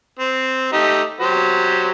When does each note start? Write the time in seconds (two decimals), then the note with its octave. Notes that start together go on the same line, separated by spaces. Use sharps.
0.19 C4
0.73 A3 D#4 G4
1.20 F#3 G4 C5